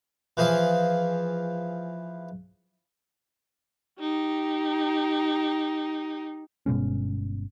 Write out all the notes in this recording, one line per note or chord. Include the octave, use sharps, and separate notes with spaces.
E3 F3 G#4 F5
D#4 G4
G1 B2 G#3 C#4